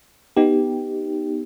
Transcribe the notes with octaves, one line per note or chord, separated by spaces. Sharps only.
B3 D#4 G4